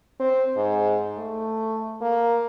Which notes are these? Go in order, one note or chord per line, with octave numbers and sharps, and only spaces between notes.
C4
G#2
A3
A#3